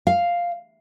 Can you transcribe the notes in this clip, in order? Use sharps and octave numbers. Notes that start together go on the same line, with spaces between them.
F5